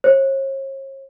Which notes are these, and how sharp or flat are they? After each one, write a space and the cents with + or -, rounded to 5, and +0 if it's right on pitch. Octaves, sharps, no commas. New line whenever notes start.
C#5 -40